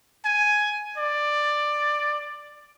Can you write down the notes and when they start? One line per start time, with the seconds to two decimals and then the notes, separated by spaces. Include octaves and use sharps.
0.25 G#5
0.98 D5